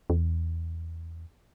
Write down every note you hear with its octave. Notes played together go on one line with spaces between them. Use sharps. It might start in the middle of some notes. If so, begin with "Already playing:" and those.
E2